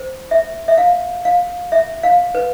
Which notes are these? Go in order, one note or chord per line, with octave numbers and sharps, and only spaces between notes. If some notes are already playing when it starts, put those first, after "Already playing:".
Already playing: C5
E5
E5
F5
F5
E5
F5
B4